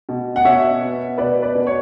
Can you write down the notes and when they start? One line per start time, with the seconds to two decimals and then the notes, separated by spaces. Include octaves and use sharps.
0.09 B2
0.36 F#5
0.45 B2 C#5 E5
0.82 B3
1.18 B2 B4 D5
1.42 B4 D5
1.55 B2
1.67 C#5